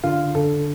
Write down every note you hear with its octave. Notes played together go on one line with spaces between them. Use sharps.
D3 F4
D3 A4